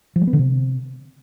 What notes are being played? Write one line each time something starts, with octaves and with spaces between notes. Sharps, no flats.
F3
G#3
B3
D3
C3